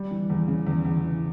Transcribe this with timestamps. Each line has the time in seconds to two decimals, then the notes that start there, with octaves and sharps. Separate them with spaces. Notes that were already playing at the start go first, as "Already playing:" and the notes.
Already playing: G3
0.11 E3
0.30 E2
0.48 C#3
0.67 E2
0.85 E2
1.04 E3